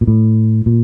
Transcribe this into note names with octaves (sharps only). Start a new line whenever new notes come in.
A#2
A2
A#2